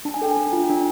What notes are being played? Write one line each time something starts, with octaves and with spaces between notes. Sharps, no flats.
D4 A5
G#5
A4 G5
G#5
D4
F4
D4